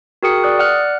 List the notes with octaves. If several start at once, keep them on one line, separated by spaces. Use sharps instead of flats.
F#4 G#4 A#4 G5 D#6 C#7
D5 D#6 F#6
D5 F#5 F6 F#6